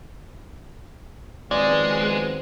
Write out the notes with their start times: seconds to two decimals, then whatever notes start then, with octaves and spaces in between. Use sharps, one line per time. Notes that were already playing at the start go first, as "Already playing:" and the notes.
1.51 D#3 F3 F#3 G#3 B3 C4 B4 D5